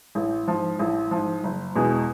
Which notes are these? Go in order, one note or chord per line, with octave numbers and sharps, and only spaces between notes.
A1
G#2 F3
A1
G#2 F3
F#1
E2 B2 G#3